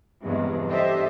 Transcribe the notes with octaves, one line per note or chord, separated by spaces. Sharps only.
E2 G2 C3 F#3 G#3
D4 G4 A4 C5 D#5 E5